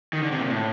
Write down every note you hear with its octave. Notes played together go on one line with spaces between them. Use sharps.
D#3
D3
C3
A#2
A2